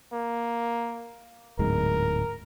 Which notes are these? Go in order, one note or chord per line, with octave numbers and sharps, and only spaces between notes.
A#3
D1 G#2 G#3 A#4